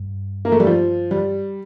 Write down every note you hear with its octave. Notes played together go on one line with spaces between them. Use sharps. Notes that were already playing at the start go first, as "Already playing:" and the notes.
Already playing: G2
A#3
A3
G3
F3
G3